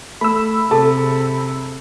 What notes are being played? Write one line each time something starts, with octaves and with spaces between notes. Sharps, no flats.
A3 B5 E6
C3 G#4 A4 A5